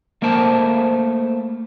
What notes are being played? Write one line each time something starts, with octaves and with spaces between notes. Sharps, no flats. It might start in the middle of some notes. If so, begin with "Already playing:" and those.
A3 A#3 A#4 C5 A5